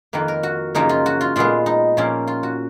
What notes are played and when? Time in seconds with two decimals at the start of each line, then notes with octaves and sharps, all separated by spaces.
0.13 F2 D#3 A#3 B4
0.28 A#4
0.43 F#4
0.75 F#2 C#3 F3 A#3 D#4
0.89 F4
1.06 F#4
1.21 F4
1.36 A#2 G#3 B3 F4
1.66 D#4
1.97 A#2 F3 A#3 C#4
2.27 F4
2.43 F#4